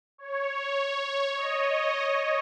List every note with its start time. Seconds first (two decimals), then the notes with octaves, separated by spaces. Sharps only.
0.18 C#5
0.58 C#5
1.36 D#5